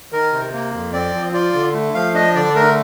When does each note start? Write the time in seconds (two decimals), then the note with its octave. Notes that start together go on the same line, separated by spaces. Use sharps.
0.12 D#3 A#4
0.33 C3
0.53 A#3
0.73 F2
0.93 C4 D5
1.14 F3
1.33 F4 D5
1.54 D3
1.74 A3
1.95 F3 F5
2.14 D4 D#5
2.35 D3 D5
2.55 A3 A#4